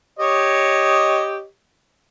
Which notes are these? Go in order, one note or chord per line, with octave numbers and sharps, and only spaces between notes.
G4 C#5 D#5